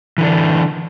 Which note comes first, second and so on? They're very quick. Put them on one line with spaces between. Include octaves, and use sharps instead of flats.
E3 D3 D4